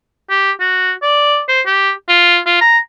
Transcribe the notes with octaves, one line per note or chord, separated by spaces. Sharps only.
G4
F#4
D5
C5
G4
F4
F4
A#5